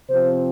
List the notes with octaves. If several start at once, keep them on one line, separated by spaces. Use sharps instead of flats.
C3 F3 C4 C5